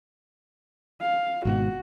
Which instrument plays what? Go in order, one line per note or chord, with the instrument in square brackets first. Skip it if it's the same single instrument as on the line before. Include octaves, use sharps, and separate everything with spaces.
[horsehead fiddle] F5
[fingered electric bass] G#1 G#2 B2 [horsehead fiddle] F#4